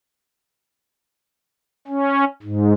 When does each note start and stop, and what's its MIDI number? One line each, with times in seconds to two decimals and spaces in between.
1.88 2.25 61
2.43 2.73 44